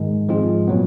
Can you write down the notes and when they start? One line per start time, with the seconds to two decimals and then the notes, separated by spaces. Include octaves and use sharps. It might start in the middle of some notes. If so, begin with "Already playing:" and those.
Already playing: G#2 D#3 G#3
0.29 G#2 F3 G#3 C4 F4
0.68 A#2 F#3 B3